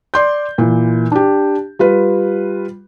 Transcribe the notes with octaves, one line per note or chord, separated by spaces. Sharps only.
D5 C6 G6
A#2 E3
D4 G4
G3 F4 B4